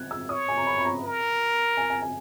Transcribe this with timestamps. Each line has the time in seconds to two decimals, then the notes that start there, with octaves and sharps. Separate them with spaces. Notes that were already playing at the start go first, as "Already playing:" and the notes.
Already playing: F#6 G#6
0.11 E6
0.29 C#5 D#6
0.48 G#5
0.57 A#5
0.67 B5
0.78 B5
0.85 A#5
1.04 A#4
1.77 G#5
1.90 G#5
2.02 G#5